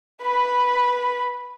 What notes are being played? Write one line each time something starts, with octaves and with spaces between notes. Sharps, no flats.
B4 B5